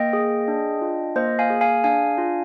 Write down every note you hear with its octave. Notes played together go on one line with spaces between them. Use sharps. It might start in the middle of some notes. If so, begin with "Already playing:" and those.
Already playing: A#3 D#5 G5
G#4
D4
F4
A#3 C5 D#5
F5 G#5
G#4
F5 G#5
D4 F5 G#5
F4